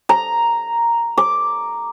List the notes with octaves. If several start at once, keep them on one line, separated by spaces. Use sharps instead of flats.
A#5
D6